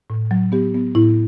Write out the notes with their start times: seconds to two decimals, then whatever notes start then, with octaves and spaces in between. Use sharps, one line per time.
0.10 A2
0.31 F#3
0.52 B3 G4
0.75 B3
0.95 A2 E4